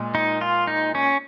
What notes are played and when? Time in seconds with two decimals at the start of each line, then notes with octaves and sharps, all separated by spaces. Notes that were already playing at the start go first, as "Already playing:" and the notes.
Already playing: A#2 G#3
0.15 D#4
0.41 F4
0.67 D#4
0.95 C#4